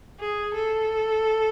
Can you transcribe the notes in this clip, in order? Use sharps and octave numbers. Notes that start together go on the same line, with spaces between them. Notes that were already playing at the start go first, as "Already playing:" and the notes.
G#4
A4